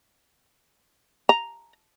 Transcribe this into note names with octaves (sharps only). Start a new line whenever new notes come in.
A#5